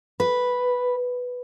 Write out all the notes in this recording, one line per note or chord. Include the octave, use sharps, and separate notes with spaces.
B4